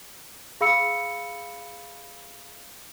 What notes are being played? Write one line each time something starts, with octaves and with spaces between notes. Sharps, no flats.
G#4 F5 B5 E6 C#7